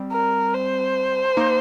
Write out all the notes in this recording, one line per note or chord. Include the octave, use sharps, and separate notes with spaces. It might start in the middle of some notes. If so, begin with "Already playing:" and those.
Already playing: G3 C4
A#4
C5
A#3 D#4